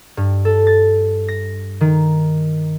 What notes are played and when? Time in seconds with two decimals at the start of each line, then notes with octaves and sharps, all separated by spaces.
0.17 G2
0.45 A4
0.67 A6
1.28 A#6
1.81 D#3